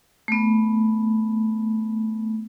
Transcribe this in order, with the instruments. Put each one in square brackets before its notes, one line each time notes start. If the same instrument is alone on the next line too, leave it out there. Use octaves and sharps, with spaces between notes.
[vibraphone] A3 B3